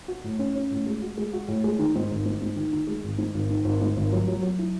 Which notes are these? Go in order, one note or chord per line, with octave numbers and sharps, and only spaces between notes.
F#4
A2
C#4
C#4
A2
G#3
F#4
G#3
F#4
A2
G#3
D#3
G#2
G#1
G#2
G#2
D#3
D#3
G#3
G#1
G#2
G#1
D#3
G#1
G#2
G#1
F#3
F#3
F#3
E4